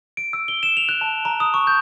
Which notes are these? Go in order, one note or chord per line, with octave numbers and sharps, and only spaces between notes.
D7
E6
G7
E7
F7
F#6
A5
A#5
D#6
C#6
G6